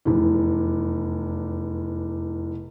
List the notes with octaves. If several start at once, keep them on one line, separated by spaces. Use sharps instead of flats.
F1 E2